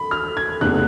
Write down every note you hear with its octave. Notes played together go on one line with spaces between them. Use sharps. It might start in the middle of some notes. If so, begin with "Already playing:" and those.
Already playing: B5
F6
G#6
F1 E2 C#3 F#6